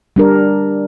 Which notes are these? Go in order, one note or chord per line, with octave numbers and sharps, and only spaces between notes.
G3 D4 A#4